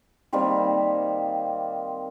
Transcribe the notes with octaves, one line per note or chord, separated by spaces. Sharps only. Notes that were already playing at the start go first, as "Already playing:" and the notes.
D#3 G3 A#3 C4